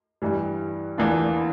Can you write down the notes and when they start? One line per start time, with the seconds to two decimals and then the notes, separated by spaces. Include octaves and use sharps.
0.22 G2 E3 G3
0.98 E2 E3 A#3 D4 F4